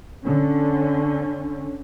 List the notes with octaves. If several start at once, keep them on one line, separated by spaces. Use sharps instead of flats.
D3 C#4